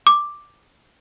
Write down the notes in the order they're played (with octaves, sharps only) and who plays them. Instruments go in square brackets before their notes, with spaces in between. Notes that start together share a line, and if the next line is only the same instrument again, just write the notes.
[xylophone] D6